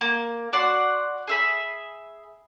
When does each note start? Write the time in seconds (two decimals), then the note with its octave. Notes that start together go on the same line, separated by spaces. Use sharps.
0.01 A#3
0.53 F#4 D5 F#5 C6
1.28 G#4 E5 B5